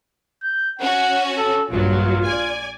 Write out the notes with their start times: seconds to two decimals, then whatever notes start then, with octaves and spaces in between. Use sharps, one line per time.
0.44 G6
0.80 C#4 F#4 F#5
1.38 A4
1.70 A#1 G2 F#3 F4
2.24 D5 G#5